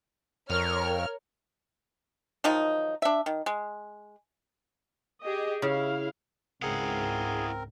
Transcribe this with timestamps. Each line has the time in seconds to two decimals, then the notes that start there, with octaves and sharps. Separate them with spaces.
0.50 F2 A#4 C#5 F6
2.44 D#3 F3 F#3 D#4
3.02 D4 E5
3.26 D#3
3.46 G#3
5.22 G4 G#4 D#5
5.62 C#3 E4 F5
6.62 C#2 G#2 C4 E4 G#4 A#4 F5 F#5